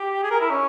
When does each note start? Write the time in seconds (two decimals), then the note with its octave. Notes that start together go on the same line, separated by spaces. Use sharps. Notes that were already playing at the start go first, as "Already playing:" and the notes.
Already playing: G4
0.23 G#4
0.31 A#4
0.40 E4
0.50 C#4